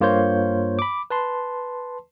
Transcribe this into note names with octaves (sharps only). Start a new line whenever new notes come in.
G2 A#3 F4 C5 C#5 G6
B5 D6
B4 A5 C6